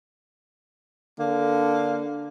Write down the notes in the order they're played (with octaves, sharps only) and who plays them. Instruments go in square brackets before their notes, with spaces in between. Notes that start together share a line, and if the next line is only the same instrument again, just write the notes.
[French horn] D3 [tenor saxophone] A#3